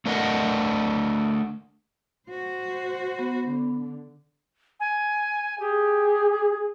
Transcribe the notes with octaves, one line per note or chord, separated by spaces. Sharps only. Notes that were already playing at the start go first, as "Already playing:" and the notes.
A3 D4 A#4 D#5 F#5
F#4 C5
B3
D3
G#5
G4 G#4